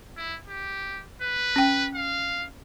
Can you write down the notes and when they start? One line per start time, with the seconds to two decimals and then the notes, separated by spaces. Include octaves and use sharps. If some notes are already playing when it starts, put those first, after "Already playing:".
0.17 E4
0.48 G4
1.22 B4
1.56 C#4 G5
1.95 F5